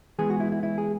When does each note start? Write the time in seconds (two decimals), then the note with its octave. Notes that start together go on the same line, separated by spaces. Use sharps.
0.18 E3 G#3 B3 G#4
0.30 F#4
0.40 E4
0.52 E4
0.63 E4
0.78 G#4